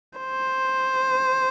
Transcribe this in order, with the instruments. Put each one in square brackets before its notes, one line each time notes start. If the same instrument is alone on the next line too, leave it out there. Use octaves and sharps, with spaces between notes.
[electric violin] C5